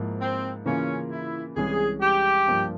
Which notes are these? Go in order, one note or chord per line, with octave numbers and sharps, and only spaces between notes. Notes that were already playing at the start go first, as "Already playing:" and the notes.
Already playing: G#2 F3 A#3 E4
C4
C#3 E3 A#3 C#4 F4
E4
C2 C3 E3 G#3 C#4 G#4
G4
G2 F3 A#3